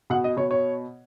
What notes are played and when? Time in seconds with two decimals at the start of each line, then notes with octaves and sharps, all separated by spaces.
0.10 B2 F#5
0.24 D#5
0.37 B2 C#5
0.51 C#5